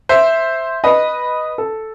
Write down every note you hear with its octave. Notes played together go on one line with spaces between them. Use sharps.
C5 E5
B4 D#5
A4